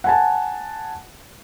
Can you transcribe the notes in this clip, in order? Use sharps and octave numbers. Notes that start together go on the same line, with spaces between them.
F#5 G#5 A5